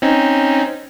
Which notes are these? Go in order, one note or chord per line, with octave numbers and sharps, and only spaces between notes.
C4 C#4 D#4